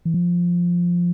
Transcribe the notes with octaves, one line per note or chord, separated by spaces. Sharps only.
E3
F3